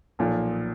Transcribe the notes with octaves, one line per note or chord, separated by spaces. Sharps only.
B1 A#2 F3